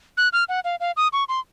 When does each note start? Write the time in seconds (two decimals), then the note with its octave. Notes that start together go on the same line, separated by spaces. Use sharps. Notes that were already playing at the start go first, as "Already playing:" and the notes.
0.17 F#6
0.33 F6
0.49 F#5
0.65 F5
0.80 F5
0.97 D#6
1.13 C#6
1.29 C6